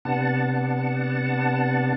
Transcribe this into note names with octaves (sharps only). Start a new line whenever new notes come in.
C3 B3 D4 F#5 A5